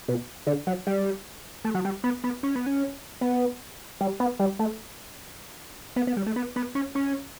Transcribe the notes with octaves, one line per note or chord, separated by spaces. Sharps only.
B2
D3
F#3
G3
A3
F#3
G3
B3
B3
C#4
B3
C#4
B3
G3
B3
G3
A3
B3
B3
G3
A3
B3
B3
C#4
C#4